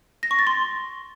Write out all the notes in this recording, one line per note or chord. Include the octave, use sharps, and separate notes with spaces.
A#6
C#6
A6
C6